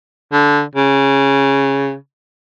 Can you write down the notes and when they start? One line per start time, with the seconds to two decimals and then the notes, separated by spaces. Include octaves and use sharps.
0.33 D3
0.75 C#3